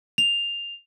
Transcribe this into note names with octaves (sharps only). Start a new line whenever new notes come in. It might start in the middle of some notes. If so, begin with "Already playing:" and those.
F7